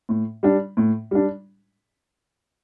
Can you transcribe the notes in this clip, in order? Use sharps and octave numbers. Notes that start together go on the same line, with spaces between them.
A2
G3 D4
A2
G3 D4